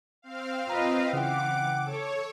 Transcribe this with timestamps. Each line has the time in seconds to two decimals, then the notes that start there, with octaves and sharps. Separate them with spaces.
0.22 C4 F5
0.69 F4 B4 D#5 A#5
1.13 C#3 E3 F#5 G5 D6
1.86 A4 C#5